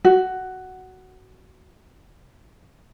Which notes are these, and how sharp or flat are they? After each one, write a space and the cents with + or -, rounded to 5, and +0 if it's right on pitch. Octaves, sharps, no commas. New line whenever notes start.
F#4 +10